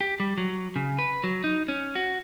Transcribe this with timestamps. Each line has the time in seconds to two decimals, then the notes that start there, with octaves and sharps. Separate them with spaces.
0.01 G4
0.20 G3
0.38 F#3
0.76 C#3
0.99 B4
1.24 F#3
1.44 D#4
1.68 C#4
1.95 F#4